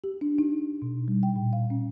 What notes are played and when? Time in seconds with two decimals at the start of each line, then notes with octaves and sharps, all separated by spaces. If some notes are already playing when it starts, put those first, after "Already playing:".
0.04 G4
0.21 D4
0.38 D#4
0.82 B2
1.08 G3
1.23 G5
1.36 A#2
1.53 F5
1.70 C#4